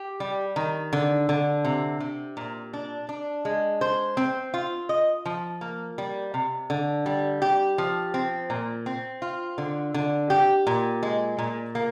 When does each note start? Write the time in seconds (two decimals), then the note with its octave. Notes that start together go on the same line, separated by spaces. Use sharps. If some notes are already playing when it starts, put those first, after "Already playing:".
Already playing: G4
0.20 G3
0.56 D#3
0.93 D3
1.29 D3
1.65 C3
2.00 C3
2.37 A#2
2.73 D4
3.09 D4
3.45 G#3
3.81 C5
4.17 C4
4.54 F4
4.89 D#5
5.26 F3
5.61 A#3
5.98 G3
6.34 C3
6.70 D3
7.06 G3
7.42 G4
7.78 F3
8.14 C4
8.50 A#2
8.86 C4
9.22 F4
9.58 D3
9.94 D3
10.30 G4
10.67 A#2
11.03 G#3
11.39 A#2
11.75 A#3